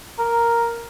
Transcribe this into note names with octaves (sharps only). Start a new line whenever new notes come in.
A#4